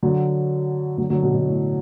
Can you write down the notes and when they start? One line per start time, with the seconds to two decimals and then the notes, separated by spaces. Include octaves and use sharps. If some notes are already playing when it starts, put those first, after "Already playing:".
0.03 D3 F#3
0.98 D3 F#3
1.10 D3 F#3
1.23 B2
1.34 B2
1.47 A2